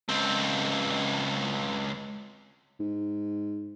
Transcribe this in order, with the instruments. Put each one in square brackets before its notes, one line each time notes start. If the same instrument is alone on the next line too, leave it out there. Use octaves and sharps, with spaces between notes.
[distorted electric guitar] C#2 C4
[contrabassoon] G#2